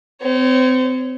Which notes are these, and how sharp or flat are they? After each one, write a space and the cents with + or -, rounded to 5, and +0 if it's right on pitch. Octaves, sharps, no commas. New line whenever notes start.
C4 -30 C#5 +0